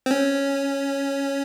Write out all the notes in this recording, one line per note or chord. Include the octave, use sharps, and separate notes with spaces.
C4
C#4